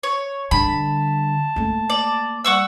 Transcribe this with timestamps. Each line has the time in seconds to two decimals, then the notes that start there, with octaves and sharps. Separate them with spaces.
0.03 C#5
0.51 D3 G3 A5 B5
1.56 A3 A#3
1.90 D5
2.44 G3 F#5 C#6 E6